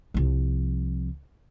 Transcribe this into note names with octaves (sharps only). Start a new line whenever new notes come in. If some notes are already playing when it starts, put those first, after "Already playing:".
C2 F3